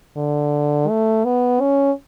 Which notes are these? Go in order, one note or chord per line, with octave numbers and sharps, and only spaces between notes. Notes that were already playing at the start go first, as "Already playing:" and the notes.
D3
A3
B3
C#4